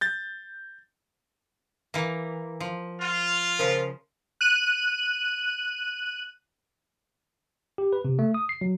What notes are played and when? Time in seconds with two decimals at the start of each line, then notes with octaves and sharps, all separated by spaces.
0.01 G6 A6
1.94 E3 A#3
2.60 F3
3.00 F4
3.59 C#3 F3 A#4 C5
4.41 F#6 D#7
7.78 G4
7.93 B4
8.05 C3
8.19 A3
8.34 D#6
8.49 C7
8.61 F#3